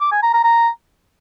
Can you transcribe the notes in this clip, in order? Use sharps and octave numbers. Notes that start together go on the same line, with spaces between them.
D6
G#5
A#5
A#5
A#5